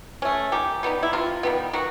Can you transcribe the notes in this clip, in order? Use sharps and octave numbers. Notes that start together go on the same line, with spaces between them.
A3 C#4
D#3 G4
G3 B3 D#4
E4
C3 F4
D#3 G3 B3
D#3 F#4